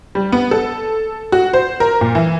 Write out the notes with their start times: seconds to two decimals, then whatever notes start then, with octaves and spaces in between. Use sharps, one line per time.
0.15 G3
0.32 B3
0.51 A4
1.32 F#4
1.53 C5
1.80 A#4
2.01 A#2
2.15 E3